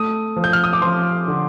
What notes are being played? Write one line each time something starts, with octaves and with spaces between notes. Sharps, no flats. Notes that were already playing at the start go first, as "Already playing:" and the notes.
Already playing: A3 D#6
F3
G6
F6
D#6
D6
F3 C6
D3